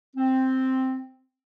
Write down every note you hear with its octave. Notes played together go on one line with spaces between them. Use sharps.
C4